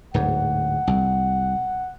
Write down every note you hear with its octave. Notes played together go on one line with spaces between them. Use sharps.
D1 G#2 F#5
C2